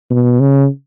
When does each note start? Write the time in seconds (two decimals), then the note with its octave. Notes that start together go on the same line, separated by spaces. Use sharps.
0.11 B2
0.40 C#3